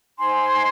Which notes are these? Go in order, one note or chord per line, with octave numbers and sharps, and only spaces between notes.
D#4 C5 G#5 C6